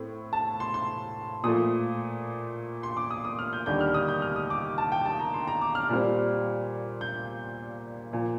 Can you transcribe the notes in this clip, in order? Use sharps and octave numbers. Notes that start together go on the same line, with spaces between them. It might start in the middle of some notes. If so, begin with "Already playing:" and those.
Already playing: A2 C4
A5
C6
C6
A#2 F3 A3 D#6
C6
D6
D#6
D#6
F6
G6
D#2 D3 G3 G6
F6
D#6
G6
F6
D#6
D6
A5
G5
A5
A#5
C6
A#5
D6
F6
A#2 G3 C4
G6
A#2 F3